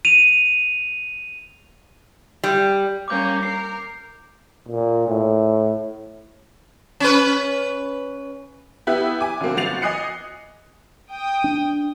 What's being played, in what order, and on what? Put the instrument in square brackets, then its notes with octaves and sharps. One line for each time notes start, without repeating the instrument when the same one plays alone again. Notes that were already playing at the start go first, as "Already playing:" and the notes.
[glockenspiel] D#7 F7
[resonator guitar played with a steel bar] G3
[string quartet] G3 A#3 C#4 [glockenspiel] D6 G6
[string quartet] A#4 [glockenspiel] C7
[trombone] A#2
A2
[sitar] C#4 B4
[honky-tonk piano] B3 E4 G4 E5 F#6
G#5 D6
D3 F#3 A#3 C4
G1 F#4 A6 C7 F7
D#5 G#5 D#6 F#6 C7 C#7
[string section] G5 D#6
[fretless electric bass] D4